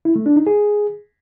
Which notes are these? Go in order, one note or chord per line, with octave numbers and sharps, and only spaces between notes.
E4
A3
D4
D#4
G#4